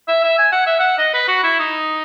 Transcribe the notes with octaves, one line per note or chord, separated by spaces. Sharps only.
E5
E5
G#5
F#5
E5
F#5
D#5
B4
F#4
E4
D#4